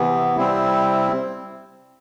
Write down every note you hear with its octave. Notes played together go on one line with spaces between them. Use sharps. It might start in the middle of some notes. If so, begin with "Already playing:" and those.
Already playing: C3 E3 B3
C3 G3 C4 E4